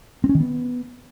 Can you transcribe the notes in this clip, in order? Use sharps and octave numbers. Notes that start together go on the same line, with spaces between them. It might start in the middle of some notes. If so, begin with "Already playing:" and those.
C4
C#4
D#3
B3